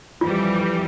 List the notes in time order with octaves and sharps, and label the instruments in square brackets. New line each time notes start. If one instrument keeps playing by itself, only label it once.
[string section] F2 E3 G3 [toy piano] F4